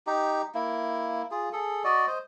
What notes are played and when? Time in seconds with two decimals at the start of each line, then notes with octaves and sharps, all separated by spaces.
0.07 D#4 G4
0.55 A#3 E4
1.31 F4 G#4
1.53 G#4 A4
1.84 F#4 D5 D#5
2.07 C5 D#5